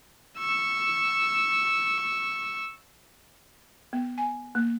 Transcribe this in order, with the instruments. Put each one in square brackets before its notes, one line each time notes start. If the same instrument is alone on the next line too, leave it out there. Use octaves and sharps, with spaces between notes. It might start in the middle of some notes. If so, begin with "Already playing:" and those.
[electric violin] C#6 E6
[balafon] B3
G#5
A#3